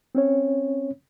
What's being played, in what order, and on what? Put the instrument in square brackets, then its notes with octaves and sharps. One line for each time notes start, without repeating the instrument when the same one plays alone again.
[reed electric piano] C4 C#4 C#5